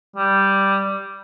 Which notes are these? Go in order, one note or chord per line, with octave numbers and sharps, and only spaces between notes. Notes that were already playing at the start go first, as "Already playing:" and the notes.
G3